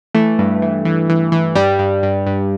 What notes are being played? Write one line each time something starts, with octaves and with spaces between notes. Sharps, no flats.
E3 A3
G2
E3
E3
E3
E3
G2 G3
G2
G2
G2